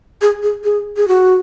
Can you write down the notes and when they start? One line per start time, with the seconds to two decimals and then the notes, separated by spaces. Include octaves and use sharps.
0.21 G#4
0.43 G#4
0.64 G#4
0.97 G#4
1.08 F#4